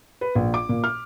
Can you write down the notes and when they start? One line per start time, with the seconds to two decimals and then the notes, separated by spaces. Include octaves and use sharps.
0.21 B4
0.35 A#1
0.54 D6
0.69 A#2
0.84 F6